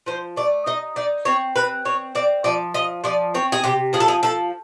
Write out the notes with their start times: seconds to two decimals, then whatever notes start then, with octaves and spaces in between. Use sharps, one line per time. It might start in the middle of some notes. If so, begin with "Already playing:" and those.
0.06 F3 C5
0.36 A3 D5
0.66 D#4 D#5
0.96 D#4 D5
1.25 C4 C#5
1.56 C4 B4
1.85 C4 C#5
2.15 C4 D5
2.44 F3 D5
2.74 F3 D#5
3.04 F3 D5
3.34 C4 C#5
3.52 G#4
3.64 C3 G4
3.93 F3 G#4
4.00 A4
4.08 G#4
4.23 F3 A4